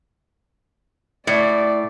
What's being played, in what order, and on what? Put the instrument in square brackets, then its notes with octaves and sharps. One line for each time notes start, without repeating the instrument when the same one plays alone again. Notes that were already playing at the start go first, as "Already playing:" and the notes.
[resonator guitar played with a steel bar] A2 [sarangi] D5